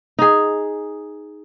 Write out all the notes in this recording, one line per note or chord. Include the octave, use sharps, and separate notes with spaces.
D#4 G#4